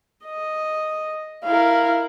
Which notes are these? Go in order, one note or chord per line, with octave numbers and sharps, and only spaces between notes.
D#5
E4 A#4 F5